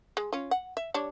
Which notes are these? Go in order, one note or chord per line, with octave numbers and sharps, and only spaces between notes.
G#3
C#4 F4
F#5
E5
G3 D4 C#5